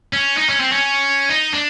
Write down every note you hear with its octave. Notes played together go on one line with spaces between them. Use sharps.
C#4
D#4
C#4
C4
C#4
D#4
D4